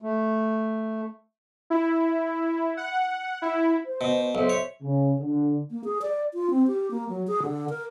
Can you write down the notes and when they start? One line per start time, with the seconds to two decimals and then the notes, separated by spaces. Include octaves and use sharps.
0.02 A3
1.70 E4
2.77 F#5
3.42 E4
3.85 C5
4.01 B2
4.35 B1 C5 E5
4.49 C#5
4.82 C#3
5.19 D3
5.71 A#3
5.84 G#4
6.02 D5
6.34 F4
6.51 C4
6.67 G4
6.91 A#3
7.09 F#3
7.27 G#4
7.43 D3
7.69 A#4